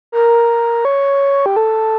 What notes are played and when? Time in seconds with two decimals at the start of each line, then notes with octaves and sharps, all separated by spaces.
0.12 A#4
0.85 C#5
1.46 G4
1.56 A4